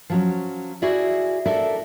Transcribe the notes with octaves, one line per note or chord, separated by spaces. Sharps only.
F3 F#3 C#4
E4 F#4 G#4 D5 E5
D4 A4 A#4 D5 E5